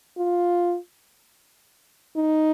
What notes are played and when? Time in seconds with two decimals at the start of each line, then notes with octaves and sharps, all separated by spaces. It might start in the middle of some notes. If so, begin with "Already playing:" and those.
0.17 F4
2.16 D#4